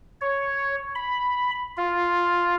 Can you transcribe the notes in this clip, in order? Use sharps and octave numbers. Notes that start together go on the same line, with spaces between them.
C#5
B5
F4